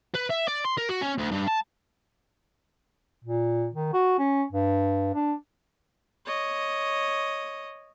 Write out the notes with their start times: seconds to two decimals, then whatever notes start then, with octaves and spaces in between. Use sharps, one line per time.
0.15 B4
0.30 E5
0.48 D5
0.65 C6
0.78 A#4
0.89 F#4
1.02 C#4
1.18 D2
1.32 G2
1.48 A5
3.25 A#2
3.74 D#3
3.93 F#4
4.18 C#4
4.52 G2
5.15 D4
6.26 C#5 D#5